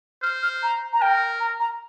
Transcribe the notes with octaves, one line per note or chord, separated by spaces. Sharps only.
C5 F6
F6
A#5
A#5
A#4 G5
A#5
A#5